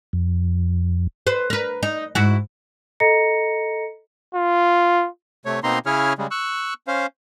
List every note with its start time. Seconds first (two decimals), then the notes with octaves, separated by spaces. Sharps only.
0.13 F2
1.27 B4 C5
1.50 A#4 B4
1.83 D#4
2.15 G#2 E4 F#4
3.00 A4 D#5 A#5 A#6 C#7
4.35 F4
5.46 C3 A3 C#5
5.64 B2 A#3 C4 D#4 A#5 C6
5.86 C#3 C#4 E4 G#4 C#5 F6
6.18 C#3 G3 G#3
6.31 C#6 E6 F#6
6.88 C#4 C5 F5